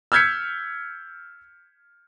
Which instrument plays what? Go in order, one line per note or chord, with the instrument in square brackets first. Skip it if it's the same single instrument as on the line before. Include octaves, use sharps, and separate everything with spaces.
[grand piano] E6 F6 G6 G#6 B6 C#7